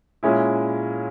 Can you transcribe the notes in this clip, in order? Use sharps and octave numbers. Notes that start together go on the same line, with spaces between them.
A#2 G#3 C#4 E4